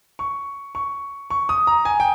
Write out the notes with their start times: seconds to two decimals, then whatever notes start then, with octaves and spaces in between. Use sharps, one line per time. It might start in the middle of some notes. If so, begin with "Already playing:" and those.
0.19 C#6
0.75 C#6
1.30 C#6
1.49 D#6
1.67 A#5
1.85 G#5
2.00 G5